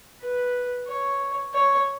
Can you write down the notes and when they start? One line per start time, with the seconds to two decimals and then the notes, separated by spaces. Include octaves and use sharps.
0.21 B4
0.87 C#5
1.54 C#5